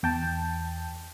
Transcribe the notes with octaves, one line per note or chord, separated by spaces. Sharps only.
E2 G5 A5